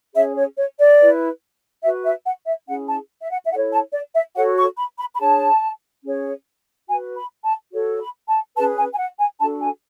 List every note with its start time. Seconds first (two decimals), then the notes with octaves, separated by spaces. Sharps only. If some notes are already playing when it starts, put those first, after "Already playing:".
0.14 C#4 G#4 C#5 E5
0.36 C#5
0.57 C#5
0.78 D5
1.00 E4 B4
1.83 F#4 B4 E5
2.04 E5
2.25 F#5
2.46 E5
2.67 C#4 E4 G#4 F#5
2.88 A5
3.21 E5
3.30 F#5
3.45 E5
3.51 E4 A4 C#5 F#5
3.72 A5
3.93 D5
4.15 E5
4.35 F#4 A4 C#5 F#5
4.57 C#6
4.77 B5
4.99 B5
5.14 B5
5.19 D4 G#4 C#5 A5
6.04 C#4 G#4 C#5
6.88 F#4 B4 G#5
7.16 B5
7.44 A5
7.72 F#4 A4 C#5
8.00 B5
8.28 A5
8.56 C#4 G#4 B4 A5
8.77 G#5
8.93 G#5
8.98 F#5
9.19 G#5
9.40 D4 F#4 A4 A5
9.62 G#5